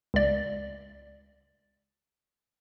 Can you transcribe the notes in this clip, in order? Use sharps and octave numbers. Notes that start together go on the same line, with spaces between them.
C#2 D5